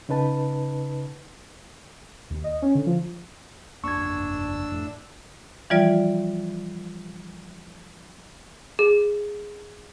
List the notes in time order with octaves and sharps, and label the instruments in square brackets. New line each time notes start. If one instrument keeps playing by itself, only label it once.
[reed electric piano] C#3 D#4 B4 A5
[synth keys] D#2
D#5
C#4
D3
F3
[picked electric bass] G1 F2 A#3 [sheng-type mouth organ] D4 E6 [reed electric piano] C#6 G#6
[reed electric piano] F2 [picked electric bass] A2
[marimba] E3 F3 G3 F4 D5
[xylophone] G#4